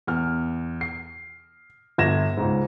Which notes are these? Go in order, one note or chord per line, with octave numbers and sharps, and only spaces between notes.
E2 F6
C7
G1 G#6 A#6 E7
C#2 G#2